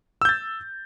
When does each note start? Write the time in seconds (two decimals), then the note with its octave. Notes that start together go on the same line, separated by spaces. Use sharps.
0.22 E6
0.25 G6
0.29 A6